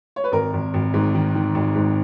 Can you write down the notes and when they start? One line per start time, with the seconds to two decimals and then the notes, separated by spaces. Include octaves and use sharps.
0.16 C#5
0.24 B4
0.32 G#1 A#4
0.53 G#1
0.74 G#1
0.94 G#2
1.14 D#3
1.35 D#3
1.55 G#1
1.76 G#2